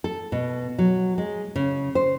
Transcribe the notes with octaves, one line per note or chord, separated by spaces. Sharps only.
A4
B2
F#3
G#3
C#3
C5